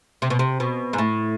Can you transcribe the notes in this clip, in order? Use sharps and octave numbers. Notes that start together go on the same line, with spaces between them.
C3
B2
C3
B2
G#2
A2